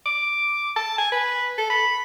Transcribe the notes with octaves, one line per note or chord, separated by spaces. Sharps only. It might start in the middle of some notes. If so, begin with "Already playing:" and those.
D6
A5
G#5
B4
A4
B5